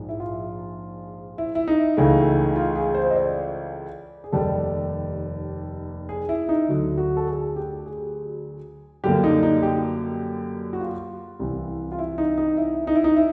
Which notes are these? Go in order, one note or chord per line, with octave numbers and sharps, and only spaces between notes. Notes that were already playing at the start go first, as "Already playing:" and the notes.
Already playing: A#1 G#2 F3
E4
F4
E4
E4
D#4
C#2 C#3 E3 A3
F4
G#4
C5
D#5
D5
G#4
F1 D#2 D#3 G3 A4
G#4
E4
D#4
D2 D3 F#3
F#4
A4
G#4
G4
G#4
F#2 D3 G3 A#3 G4
D#4
D#4
G4
F#4
F4
C2 C3 E3
F4
E4
D#4
D#4
E4
D#4
E4
D#4
E4